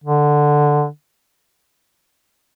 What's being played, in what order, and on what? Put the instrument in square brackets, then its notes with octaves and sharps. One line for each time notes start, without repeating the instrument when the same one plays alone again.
[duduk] D3